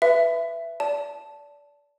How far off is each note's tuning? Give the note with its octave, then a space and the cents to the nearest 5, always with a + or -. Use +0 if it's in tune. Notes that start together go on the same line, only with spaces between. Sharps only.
B4 +0 E5 +15 B5 +35
D5 -25 A5 +0